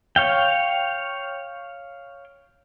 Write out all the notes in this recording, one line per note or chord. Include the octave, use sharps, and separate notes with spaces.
C#5 F5 G5